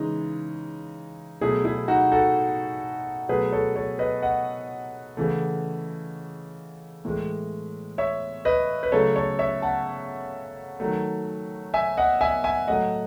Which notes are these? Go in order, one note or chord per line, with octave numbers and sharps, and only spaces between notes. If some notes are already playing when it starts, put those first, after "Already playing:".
Already playing: C#3 E3 G#3 D#4
B2 F#3 A3 E4 G#4
E4 G#4
D#4 F#4
F#4 A4
B2 F#3 A3 G#4 B4
A4 C#5
A4 C#5
B4 D#5
D#5 F#5
C#3 E3 A3
A2 E3 G#3
C#5 E5
B4 D#5
B4
C#3 F#3 A3 A4 C#5
A4 C#5
C#5 E5
F#5 A5
D#3 F#3 A3
E5 G#5
D#5 F#5
E5 G#5
E5 G#5
A2 F#3 A3 D#5 F#5